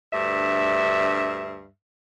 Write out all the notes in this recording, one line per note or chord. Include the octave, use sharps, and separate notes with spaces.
D2 G2 E5